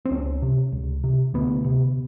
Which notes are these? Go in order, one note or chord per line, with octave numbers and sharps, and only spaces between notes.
C4
C#2 C#4
C3
C#2
C3
D2 B3
C3